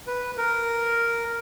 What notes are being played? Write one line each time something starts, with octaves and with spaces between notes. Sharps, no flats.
B4
A#4